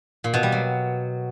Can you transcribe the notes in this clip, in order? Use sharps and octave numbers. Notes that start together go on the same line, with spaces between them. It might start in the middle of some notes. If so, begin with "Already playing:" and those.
A#2
B2
G3
F#3